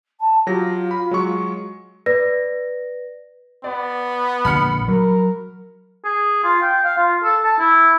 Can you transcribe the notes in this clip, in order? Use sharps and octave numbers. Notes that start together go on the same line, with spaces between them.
A5
F#3 F4 G4 A#6
B5
F#3 G#3 C#6
B4 D5 A#6
B3 D5
A#1 D3 B5 F6 C#7
F#3 A#4
G#4
F4
G5
F5
F4
A4
A5
E4